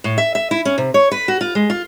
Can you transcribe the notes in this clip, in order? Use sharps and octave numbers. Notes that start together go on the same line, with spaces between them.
A2
E5
E5
E4
C#4
C3
C#5
B4
F#4
F4
G#3
F4